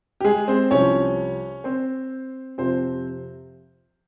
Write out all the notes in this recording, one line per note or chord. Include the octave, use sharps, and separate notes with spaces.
G4
G#3 G#4
C4 C5
C2 C3 F3 C#4 C#5
C4 C5
F2 C3 F3 C4 C5